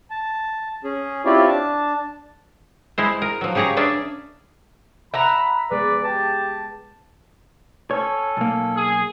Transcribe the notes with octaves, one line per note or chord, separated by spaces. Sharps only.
A5
C#4 G#4
C4 E4 F4 G4 C#5 D5
D4 A5
G#3 E4 C5
A#4
F3 F#3
C#3 G4 G#4 C#5 A#5
C#4 D4 G#4 E5
E5 F#5 A#5 B5
G#3 B3 B4 D5
G4 A5
C#4 A4 C#5
B1 A#3
G#4